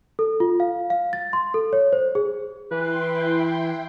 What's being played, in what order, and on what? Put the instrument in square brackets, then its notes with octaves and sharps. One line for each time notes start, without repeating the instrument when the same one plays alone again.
[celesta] A4
F4
F5
F5
A6
C6
A4
C#5
C5
G#4
[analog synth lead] E3 [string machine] E4 G5 C6 [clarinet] B4